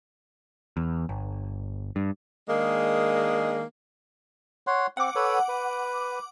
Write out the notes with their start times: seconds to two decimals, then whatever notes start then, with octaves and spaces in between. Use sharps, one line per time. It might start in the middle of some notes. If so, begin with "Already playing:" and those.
0.77 E2
1.09 G1
1.96 G2
2.48 D#3 G#3 A#3 D4 G#4
4.67 C#5 F#5 C6
4.97 C4 F#5 D6
5.15 A4 B4 C#5
5.48 B4